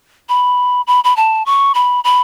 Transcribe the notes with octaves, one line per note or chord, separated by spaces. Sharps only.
B5
B5
B5
A5
C#6
B5
B5